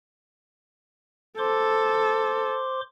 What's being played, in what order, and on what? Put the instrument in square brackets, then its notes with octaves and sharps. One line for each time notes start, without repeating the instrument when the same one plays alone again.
[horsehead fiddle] A4 [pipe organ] C5 C6 D6